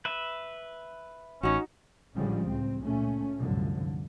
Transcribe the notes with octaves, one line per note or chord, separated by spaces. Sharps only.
B4 E5
A1 C#4 D#4 F#4
A1 D3 F3 G3 G#3 C#4
C#2 A2 C4
A#2 A3 C#4
C2 F#2 A2 D3 F3